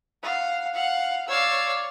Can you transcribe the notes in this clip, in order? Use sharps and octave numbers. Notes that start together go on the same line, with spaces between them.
F5 F#5
F5 F#5
C#5 D5 F5 E6